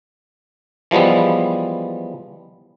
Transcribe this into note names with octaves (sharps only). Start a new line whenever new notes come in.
E3 F3 G3 G#3 B3